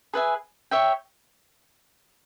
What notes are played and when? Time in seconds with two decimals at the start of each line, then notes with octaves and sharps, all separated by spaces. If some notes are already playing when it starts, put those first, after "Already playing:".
0.13 G#4 B4 E5 G#5
0.71 C#5 E5 G5